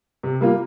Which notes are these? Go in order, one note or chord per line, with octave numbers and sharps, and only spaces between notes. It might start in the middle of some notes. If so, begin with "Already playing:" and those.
C3
G3 A#3 F4